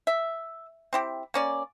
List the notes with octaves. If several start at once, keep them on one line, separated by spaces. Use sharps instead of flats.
E5
C4 E4 G4
A#3 C#4 D5